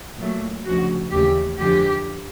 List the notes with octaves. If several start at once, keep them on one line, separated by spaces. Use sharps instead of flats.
A#2 F#3 A3
D2 C#3 F3 G#3 F#4
D#2 C#3 E3 A3 G4
F2 D3 F3 G#3 G4